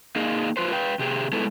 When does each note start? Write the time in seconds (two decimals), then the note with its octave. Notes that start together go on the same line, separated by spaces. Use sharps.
0.16 A#3 D#4 G#4 D#5 F5
0.57 F4 B4 C5
0.72 B4 F5 G5
0.99 C3 G4 G#4
1.33 G#3 A3 B3 E4 A4